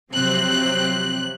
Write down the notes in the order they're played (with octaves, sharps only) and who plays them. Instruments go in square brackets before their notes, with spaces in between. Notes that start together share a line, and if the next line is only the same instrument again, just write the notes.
[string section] C3 F3 F#3 C4 F#6